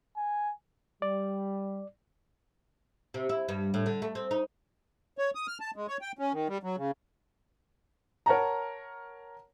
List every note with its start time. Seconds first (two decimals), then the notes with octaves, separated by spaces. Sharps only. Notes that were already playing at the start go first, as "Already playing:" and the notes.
0.17 G#5
1.02 G3 D5
3.14 C3
3.29 E4
3.49 G2
3.74 A2
3.86 D3
4.02 A3
4.15 C4
4.31 D#4
5.18 C#5
5.35 D#6
5.47 F6
5.60 A5
5.76 G#3
5.88 C#5
6.01 G5
6.19 C#4
6.33 D#3
6.48 G3
6.63 F#3
6.77 C#3
8.26 A#4 C#5 F#5 A5 A#5